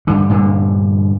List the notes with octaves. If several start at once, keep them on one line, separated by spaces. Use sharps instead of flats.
G2 D3
G2 A#2 D3